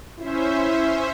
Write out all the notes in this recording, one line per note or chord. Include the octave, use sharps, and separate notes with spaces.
C#4 E4 C5 E5